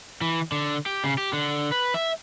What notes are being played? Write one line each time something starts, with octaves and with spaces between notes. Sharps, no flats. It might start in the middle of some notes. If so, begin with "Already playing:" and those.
E3
D3
G4
C#3
G4
D3
B4
E5